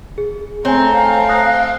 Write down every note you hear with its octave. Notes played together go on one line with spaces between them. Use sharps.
G#4
A3 C4 C#5 G#5 A#5
F5
D#6 F#6 A#6